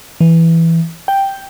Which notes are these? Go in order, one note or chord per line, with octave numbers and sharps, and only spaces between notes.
E3
G5